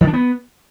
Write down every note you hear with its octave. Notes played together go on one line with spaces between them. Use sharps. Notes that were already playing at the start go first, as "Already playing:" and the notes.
D#3
D4
B3